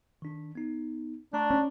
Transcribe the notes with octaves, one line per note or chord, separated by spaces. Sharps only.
D#3 D4
B3 D#4
A3 D4 A#5 C#6
C#4